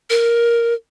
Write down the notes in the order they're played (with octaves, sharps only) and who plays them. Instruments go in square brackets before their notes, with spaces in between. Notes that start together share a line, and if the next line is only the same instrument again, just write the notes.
[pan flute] A#4